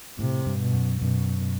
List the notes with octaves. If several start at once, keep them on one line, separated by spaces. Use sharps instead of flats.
A2 C3
G2
B2
F#2
F#2 B2